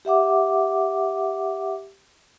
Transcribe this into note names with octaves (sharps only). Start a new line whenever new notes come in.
G4 E5 F#5 D6